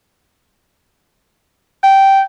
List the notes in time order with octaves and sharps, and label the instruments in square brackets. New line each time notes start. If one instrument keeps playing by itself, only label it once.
[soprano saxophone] G5